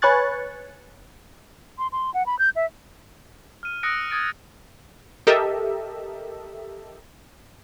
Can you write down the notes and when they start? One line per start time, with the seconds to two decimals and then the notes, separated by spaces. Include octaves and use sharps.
0.02 B4 C#5 G#5 C#6 F#6 A6
1.78 C6
1.92 C6
2.14 F#5
2.26 B5
2.39 G6
2.56 E5
3.63 F6 D#7
3.83 D#6 E6 F#6 A#6 C#7 D7
4.11 D#6 G#6 A6 D7
5.27 G4 A4 A#4 D#5 E5